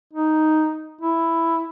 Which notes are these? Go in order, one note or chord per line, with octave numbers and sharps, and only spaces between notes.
D#4
E4